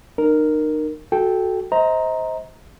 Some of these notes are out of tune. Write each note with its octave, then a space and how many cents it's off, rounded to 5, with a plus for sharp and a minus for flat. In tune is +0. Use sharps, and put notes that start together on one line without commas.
D#4 -35 A#4 +0
F#4 +0 A4 -15 G5 +0
C5 +0 D#5 +35 A#5 +0